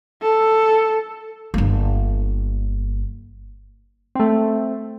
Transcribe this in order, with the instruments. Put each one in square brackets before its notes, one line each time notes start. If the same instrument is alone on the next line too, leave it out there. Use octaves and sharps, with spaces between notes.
[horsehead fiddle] A4
[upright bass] G1 A#3
[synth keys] A3 C4